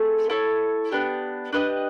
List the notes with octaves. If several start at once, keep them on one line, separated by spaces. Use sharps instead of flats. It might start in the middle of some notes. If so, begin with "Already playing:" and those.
Already playing: A3 C4 G#4
E4 A4 C#5
B3 D4 G4
D4 G4 B4 D#5